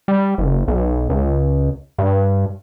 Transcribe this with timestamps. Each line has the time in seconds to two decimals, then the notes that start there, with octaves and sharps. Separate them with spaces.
0.08 G3
0.38 F#1
0.68 B1
1.10 C#2
1.98 G2